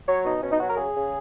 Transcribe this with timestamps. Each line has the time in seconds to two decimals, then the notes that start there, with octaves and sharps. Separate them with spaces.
0.08 F#3 C#5
0.25 B2 D#4
0.43 B2 C#4
0.52 D#4
0.60 F#3 F#4
0.69 A#4
0.78 C#3 G#4
0.95 C#3